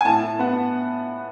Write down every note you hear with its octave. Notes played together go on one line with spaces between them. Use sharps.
G#5
A2 A5
A2
B3 F#5